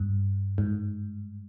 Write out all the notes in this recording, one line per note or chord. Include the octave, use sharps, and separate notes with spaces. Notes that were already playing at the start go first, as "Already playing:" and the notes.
Already playing: G2
G#2